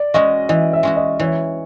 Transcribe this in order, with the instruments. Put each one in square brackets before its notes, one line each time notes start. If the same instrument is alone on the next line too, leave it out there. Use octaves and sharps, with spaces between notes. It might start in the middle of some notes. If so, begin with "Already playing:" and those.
Already playing: [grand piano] D5
[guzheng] G#3 C#4 F#4 [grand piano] D#5
[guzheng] E3 [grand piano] D#5
[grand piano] E5
[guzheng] G#3 C#4 F#4
[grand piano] D#5
[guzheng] E3 [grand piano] C#5